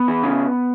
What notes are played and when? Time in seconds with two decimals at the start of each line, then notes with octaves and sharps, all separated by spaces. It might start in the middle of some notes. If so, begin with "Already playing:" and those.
Already playing: B3
0.08 E3
0.23 C#3